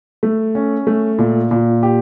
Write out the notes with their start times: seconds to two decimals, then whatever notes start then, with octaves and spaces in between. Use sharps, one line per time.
0.23 A3
0.55 C#4
0.87 A3
1.18 A#2
1.51 A#2
1.83 G4